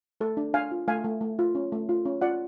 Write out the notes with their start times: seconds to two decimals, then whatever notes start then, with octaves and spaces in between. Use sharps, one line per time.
0.21 A3 A4
0.37 D4
0.54 D4 F5 G#5
0.71 F4
0.88 A3 F5 G#5
1.04 A3
1.21 A3
1.39 F4
1.55 C#4
1.72 A3
1.89 F4
2.05 C#4
2.22 F4 D5 F#5